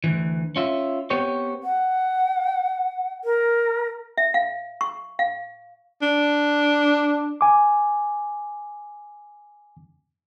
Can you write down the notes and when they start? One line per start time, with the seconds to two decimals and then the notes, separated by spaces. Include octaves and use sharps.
0.04 D2 G2 E3
0.56 C#4 F4 E5
1.10 B3 C4 G4 C5 C#5
1.62 F#5
3.24 A#4
4.18 E5
4.34 F5
4.81 C#6
5.19 F5
6.02 D4
7.41 G#5 D6